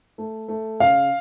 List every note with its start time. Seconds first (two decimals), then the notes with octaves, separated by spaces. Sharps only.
0.18 A3
0.48 A3
0.80 C#3 F5